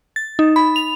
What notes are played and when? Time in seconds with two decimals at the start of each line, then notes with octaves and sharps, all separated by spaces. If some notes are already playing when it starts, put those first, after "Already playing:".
0.16 A6
0.39 D#4
0.56 B5
0.76 F7